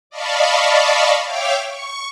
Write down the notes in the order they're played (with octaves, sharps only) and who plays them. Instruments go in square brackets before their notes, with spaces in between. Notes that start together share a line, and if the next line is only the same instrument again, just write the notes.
[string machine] D5 D#5 F5 A5 B5 C#6
C#5 E5 F5 G5 D6 F6
C#6